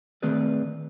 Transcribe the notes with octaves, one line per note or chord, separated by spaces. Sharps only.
D#3 A3 C4 G#4 B4 D5